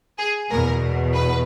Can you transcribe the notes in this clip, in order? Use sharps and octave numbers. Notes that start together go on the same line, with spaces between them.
G#4
E2 B2 A#4
B4